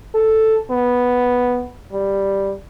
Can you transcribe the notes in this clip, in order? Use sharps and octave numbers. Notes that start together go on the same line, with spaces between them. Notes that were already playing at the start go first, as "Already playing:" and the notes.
A4
B3
G3